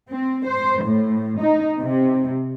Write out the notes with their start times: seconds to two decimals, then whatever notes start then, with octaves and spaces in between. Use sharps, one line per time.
0.10 C4
0.46 C5
0.83 A2
1.39 D#4
1.79 C3